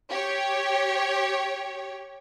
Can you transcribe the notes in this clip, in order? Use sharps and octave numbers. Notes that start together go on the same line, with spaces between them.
G4 C#5